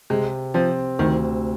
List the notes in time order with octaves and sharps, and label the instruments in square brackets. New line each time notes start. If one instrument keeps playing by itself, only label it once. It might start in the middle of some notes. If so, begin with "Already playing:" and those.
[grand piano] C3 [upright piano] G#3
[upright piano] F3 [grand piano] C4
[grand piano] D2 [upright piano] D#3